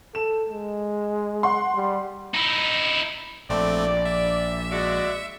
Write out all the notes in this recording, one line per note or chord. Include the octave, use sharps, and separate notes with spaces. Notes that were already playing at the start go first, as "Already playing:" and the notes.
A4 E7
G#3
F#5 C6
G3
D#4 E4
A#1 A3 C4 D5
E5
G#3 F#4 D5